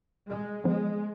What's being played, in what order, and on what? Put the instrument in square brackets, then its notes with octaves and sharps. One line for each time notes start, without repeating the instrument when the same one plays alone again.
[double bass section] G#3
[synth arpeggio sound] D3 F3 B3 [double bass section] G#3